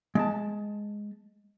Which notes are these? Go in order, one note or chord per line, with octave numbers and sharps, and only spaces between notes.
G#3 A5